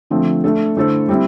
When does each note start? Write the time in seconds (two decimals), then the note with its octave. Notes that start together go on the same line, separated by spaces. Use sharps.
0.10 D3 F3 A3 C4
0.44 A3 D4 A4
0.76 D3 A3 E4 A4 C5
1.08 G3 C4 E4